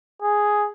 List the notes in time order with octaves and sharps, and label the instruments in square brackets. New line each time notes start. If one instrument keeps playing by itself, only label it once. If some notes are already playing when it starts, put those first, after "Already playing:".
[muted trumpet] G#4